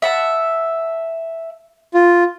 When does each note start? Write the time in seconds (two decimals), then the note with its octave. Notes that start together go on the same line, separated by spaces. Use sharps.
0.02 E5 F#5 A5
1.94 F4